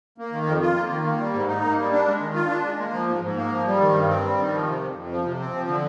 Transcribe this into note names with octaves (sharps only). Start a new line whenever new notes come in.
A#3
D#3
F2
F4
A#3
D#3
A#3
G3
G#2
D#4
A#3
G3
D4
G#3
D#3
F4
D4
G#3
A#3
F3
G#2
G#2
A#3
F3
G3
D#3
G2
C4
G3
D#3
F3
C3
F2
F2
F3
C3
C4
F3
D3